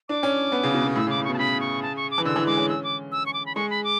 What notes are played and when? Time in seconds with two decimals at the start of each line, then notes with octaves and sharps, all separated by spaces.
0.09 D4 D6
0.23 C#4
0.52 B3
0.63 C#3
0.74 B2
0.85 B2
0.95 A2 E6
1.07 C#3
1.10 D6
1.17 A2
1.24 B2 C#6
1.34 A5
1.39 C#3 B5
1.61 C#6
1.82 A5
1.96 C#6
2.11 D6
2.18 E3
2.25 D3 E6
2.36 E3
2.47 G#3 D6
2.57 C#4
2.69 E6
2.84 D6
3.12 E6
3.26 C#6
3.34 D6
3.46 B5
3.55 G#3 C#6
3.70 B5
3.84 D6